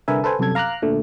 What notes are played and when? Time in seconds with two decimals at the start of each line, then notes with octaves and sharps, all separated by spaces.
0.08 C2 D3 A#4 B4 E5 G#5
0.24 A4 B4 C5 G#5
0.39 C2 F#2 C3 F#3 A4 G#6
0.55 F5 A#5 D6 F6 F#6
0.82 A#2 D3 A3